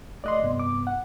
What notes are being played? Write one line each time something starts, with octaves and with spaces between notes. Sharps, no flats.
A1 A3 D5 D#5 C6 F#6
G2 C3 B3
D6
F#5